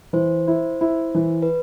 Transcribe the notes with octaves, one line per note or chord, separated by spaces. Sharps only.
E3 C5
E4
E4
E3
B4